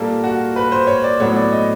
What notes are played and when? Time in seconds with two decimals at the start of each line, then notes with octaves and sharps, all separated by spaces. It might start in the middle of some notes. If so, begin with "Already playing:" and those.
Already playing: A#2 G3 A#3 A4
0.24 F#4
0.56 B4
0.72 C5
0.87 C#5
1.04 D5
1.20 A2 F#3 B3 C#5
1.36 D5
1.52 D#5